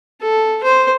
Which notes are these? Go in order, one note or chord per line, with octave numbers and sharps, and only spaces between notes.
A4
C5